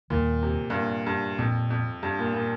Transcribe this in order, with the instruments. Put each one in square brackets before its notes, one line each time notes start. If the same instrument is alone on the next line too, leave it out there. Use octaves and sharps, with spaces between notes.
[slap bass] D#2 D#3 G3 [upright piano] A#2
[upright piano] C3
G2
A#2
G2
[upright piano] F2 [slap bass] A#2 A#3
[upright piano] F2
G2
A#2
A#2